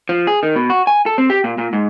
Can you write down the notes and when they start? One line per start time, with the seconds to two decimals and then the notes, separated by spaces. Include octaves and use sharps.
0.09 F3
0.27 G#4
0.43 D#3
0.56 B2
0.70 F#4
0.87 G#5
1.06 A4
1.18 C4
1.30 G4
1.44 A#2
1.58 A#2
1.73 G#2